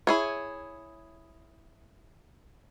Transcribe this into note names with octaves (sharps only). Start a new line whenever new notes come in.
E4 G#4 C#5